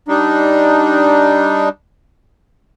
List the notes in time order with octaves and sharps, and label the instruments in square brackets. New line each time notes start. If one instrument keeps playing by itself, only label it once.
[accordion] G3 D4 D#4